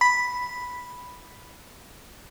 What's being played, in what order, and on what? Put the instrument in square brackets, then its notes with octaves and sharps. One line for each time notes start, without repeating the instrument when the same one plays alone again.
[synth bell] B5 B6